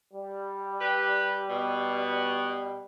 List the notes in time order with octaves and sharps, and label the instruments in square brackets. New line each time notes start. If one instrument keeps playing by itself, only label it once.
[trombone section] G3
[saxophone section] G4 B4
B2